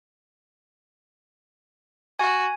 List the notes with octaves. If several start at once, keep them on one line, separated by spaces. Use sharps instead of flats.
F#4 G#5